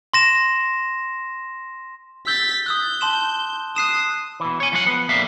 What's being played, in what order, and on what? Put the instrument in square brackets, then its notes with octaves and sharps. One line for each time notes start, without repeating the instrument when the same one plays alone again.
[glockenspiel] C6 A#6 E7
[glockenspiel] E6 G6 G7 [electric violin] A6 B6
[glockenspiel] D#6 E6 F#6 [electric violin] G6
[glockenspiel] A5 C6 E7
[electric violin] D#6 [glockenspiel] F#6 C7 E7
[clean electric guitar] B2 E3
C#5 G#5
C#2 F3 F#3 F4 C#5 F#5
F3 B3
F2 D3 G3 A#3 E5 F5